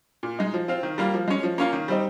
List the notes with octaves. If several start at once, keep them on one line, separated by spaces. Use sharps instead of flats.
A#2
G#3 D#4
F3
C4 F4
D#3
G3 A#3 F4
F3
G#3 C#4
F3
A#3 C#4 F4
D#3
G3 C4 D#4